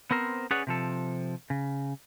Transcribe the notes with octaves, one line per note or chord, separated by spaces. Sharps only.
B3 C4 A#4 C5
C#4 G#4 B4 C#5 D5 F#5
C3 F3 A4
C#3